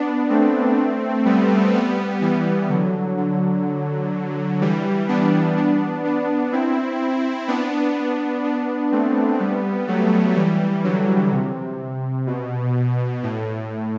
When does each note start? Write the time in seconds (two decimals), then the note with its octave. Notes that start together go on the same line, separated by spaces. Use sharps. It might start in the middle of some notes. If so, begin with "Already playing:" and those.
Already playing: B3 D4
0.29 A3 C4
1.25 G3 B3
1.73 G3 B3
2.21 E3 G3
2.69 D3 F#3
3.17 D3 F#3
4.61 E3 G3
5.08 B3 D4
5.56 B3 D4
6.04 B3 D4
6.52 C4 E4
7.48 B3 D4
8.44 B3 D4
8.92 A3 C4
9.40 G3 B3
9.88 F#3 A3
10.36 E3 G3
10.84 D3 F#3
11.32 C3
12.27 B2
13.23 A2